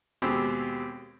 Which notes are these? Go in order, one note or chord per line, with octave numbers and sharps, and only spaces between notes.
D#2 B2 G#3 C4 G4 E6